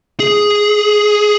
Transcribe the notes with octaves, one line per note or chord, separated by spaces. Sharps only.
G#4